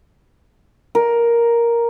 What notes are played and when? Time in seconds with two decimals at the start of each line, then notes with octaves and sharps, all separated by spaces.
0.95 A#4